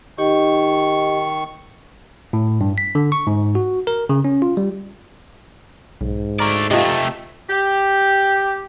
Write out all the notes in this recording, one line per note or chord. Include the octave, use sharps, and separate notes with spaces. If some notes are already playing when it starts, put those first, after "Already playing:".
D#3 D#4 G4 D#5 C#6
A2
G2
B6
D3
C#6
G#2
F#4
A#4
C#3
C#4
F4
G3
B1 G#2
A3 D5 A#5 F6
C3 A3 F4 G4 D#5
G4